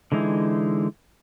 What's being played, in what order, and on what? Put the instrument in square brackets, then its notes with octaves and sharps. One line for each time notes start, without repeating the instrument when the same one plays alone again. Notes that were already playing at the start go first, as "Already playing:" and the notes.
[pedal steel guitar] D3 E3 G#3 D#4 E4